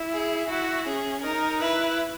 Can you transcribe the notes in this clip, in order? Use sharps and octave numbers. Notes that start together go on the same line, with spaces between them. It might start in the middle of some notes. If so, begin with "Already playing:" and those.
Already playing: E4
G#4
E4 F#4
C#4 G#4
D#4 A#4
E4 B4